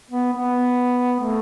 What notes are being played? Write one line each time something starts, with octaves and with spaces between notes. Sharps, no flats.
B3
B3
A3